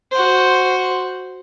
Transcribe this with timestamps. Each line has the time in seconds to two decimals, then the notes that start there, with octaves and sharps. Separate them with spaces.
0.12 F#4 C5